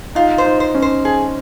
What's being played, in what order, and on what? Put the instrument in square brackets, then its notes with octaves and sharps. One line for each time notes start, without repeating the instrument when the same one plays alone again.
[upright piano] D#4 [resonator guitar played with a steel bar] F4
[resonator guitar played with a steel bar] C5
[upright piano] D#4
[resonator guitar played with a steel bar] C5
[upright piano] C#4
[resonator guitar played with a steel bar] C5
G#4